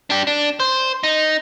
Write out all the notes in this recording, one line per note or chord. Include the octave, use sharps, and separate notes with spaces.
D4 G4
D4
C5
D#4